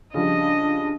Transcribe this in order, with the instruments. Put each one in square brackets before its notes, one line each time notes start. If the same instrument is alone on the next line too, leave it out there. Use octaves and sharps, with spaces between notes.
[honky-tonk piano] C#3 F3 G3 [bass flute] D4 [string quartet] D#5